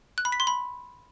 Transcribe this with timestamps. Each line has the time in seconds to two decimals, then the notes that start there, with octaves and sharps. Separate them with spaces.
0.18 F#6
0.25 B5
0.32 B6
0.40 C6
0.47 B5